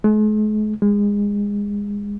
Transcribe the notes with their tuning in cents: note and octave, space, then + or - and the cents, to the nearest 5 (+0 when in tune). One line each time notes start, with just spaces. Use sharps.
G#3 +45
G#3 -25